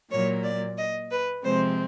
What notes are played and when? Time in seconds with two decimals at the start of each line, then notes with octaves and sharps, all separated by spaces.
0.11 A#2 F#3 A#3 C#5
0.44 D5
0.78 D#5
1.11 B4
1.45 C3 F3 G#3 C4 C5